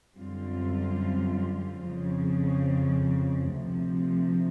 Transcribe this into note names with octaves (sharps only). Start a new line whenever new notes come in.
F#2 D3 G3 C4 F4
F2 C#3 F3
D2 C3 F3